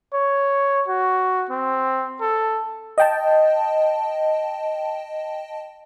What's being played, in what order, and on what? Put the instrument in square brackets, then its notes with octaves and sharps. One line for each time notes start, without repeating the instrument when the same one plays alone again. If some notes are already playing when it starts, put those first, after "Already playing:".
[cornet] C#5
F#4
C4
A4
[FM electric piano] D#5 G5 A5